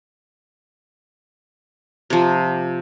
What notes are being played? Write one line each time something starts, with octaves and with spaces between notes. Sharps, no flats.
C3 F3